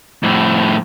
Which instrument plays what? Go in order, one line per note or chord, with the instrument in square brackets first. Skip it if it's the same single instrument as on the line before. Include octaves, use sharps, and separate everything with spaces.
[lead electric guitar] F2 A2